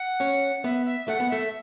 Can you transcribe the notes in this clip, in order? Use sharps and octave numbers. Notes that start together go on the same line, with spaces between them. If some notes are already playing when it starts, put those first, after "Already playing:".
Already playing: F#5
C#4
B3 E5
E5
A3 F#5
B3
A3 E5